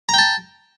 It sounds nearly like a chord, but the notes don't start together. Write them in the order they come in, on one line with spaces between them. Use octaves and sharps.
A#5 G5 A5